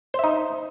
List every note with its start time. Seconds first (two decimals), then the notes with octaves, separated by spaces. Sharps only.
0.14 C5
0.19 E5
0.24 D#4